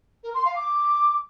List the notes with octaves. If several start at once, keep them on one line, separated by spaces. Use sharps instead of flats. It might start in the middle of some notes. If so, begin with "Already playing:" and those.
A#4
C6
F5
D6